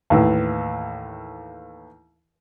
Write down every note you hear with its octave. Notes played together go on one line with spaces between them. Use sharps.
D#2 A2 E3